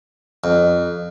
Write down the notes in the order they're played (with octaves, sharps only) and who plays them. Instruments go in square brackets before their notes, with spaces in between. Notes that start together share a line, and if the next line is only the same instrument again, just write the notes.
[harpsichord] F2